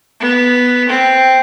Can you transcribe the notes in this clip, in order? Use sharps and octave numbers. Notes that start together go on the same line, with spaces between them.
B3
C4